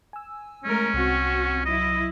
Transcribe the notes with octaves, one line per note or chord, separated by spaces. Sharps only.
G#5 E6
G#3 A3 C#4 A#4
C2 C4 F#4
F#3 E4 D#5